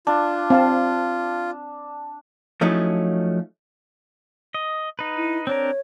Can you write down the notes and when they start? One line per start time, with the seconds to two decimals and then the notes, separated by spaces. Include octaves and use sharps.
0.07 D4 F4
0.50 C4 F5 A5
2.61 F3 F#3 A3 C#4 D#4 E4
4.54 D#5
4.99 D#4 B4
5.17 E4
5.47 C4 D4 A#4 C#5